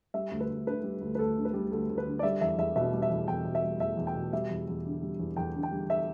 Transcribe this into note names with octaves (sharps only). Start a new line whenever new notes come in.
G3 E5
D2
B4
D2
D3 B4
G3
D2
B4
D2 A4
D3
B4
G3
D2 A4
D2
B4
D3
D5
G3 E5
E2 E5
E2 E5
B2 E5
G3
E5
E2
E2 G5
B2
E5
G3
E2 E5
E2
G5
B2
G3 E5
E2
E2
D3
G3
E2
E2 G5
D3
G5
G3
E5